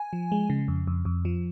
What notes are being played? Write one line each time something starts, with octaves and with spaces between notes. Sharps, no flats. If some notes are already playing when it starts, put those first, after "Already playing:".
Already playing: G#5
F3
G#3
C#3
F2
F2
F2
F3